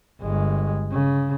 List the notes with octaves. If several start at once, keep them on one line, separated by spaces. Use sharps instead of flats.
G1 G#3
C#3